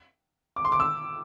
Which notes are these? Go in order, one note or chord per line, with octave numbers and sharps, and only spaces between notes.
D6
C6
D6
E6